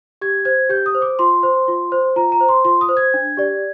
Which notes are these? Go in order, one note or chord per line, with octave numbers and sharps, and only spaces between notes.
G4 G#6
C5 G#6
G4 G6
D#6
C5
D6
F4 C6
C5
F4
C5
F4 A#5
A#5
C5
C6
F4 C6
D#6
C5
G#6
D4
G4 D5